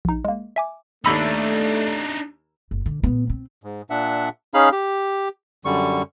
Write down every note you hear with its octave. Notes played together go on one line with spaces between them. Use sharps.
A#1 D#4
G#3 A#3
E5 G#5 D6
D#2 A3 D4 D#4 B5 E6
F#1
D3
A#2 B3
C4
G#2
A#2 D4 E5 F#5
C#4 D#4 G#4 F5 B5
G4
F#2 D3 G3 C#6